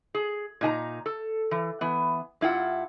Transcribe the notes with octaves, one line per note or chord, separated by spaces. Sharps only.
G#4
A#2 D#4 G#5 A#5
A4
E3
E3 B3
G2 E4 F4 F#5